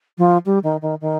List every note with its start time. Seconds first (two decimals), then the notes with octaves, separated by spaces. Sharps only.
0.18 F3
0.46 G3
0.63 D#3
0.82 D#3
1.01 D#3